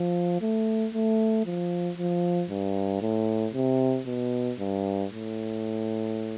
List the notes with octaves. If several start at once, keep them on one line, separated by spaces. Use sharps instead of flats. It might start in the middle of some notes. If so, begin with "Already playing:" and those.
Already playing: F3
A3
A3
F3
F3
G2
A2
C3
B2
G2
A2